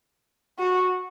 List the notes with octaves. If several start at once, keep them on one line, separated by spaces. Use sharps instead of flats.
F#4